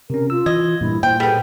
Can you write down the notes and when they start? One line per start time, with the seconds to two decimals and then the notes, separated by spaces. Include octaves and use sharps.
0.10 C3 C#4 A#4
0.30 F4 E6
0.46 E3 D#5 G#6
0.81 G2 A#2 E4
1.03 A#2 C5 G5
1.20 G3 B3 G#4 A4 G5